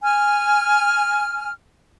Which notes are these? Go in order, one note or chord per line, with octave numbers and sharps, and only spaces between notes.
G#5 F6